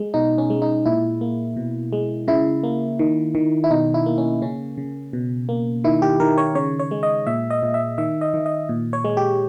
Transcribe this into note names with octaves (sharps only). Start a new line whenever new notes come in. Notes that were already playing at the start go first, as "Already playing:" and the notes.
Already playing: G#3
B2 D#4
C#4
G#3
D#4
A#2 E4
A#3
B2
G#3
C#3 E4
A#3
D#3
D#3
E4
B2 D#4
E4
A#3
C#4
C#3 C#4
C#3
B2
A#3
D#3 E4
G4
D#3 A#4
C#5
C#3 C#5
C#5
G#3
D#5
A#2 E5
D#5
A#2
E5
D#3 E5
D#5
D#3
D#5
A#2
C#5
G#3
G4